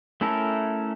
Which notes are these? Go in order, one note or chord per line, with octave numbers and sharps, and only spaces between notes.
A3 C#4 E4 A4 A#4